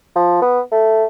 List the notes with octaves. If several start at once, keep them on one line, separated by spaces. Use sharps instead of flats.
F3
B3
A3